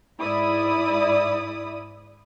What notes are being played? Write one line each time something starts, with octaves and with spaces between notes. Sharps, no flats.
G#2 E4 D5 B5 D#6